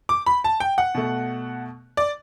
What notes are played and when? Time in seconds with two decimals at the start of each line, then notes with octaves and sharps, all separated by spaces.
0.09 D6
0.26 B5
0.44 A5
0.60 G5
0.78 F#5
0.95 B2 A3
1.97 D5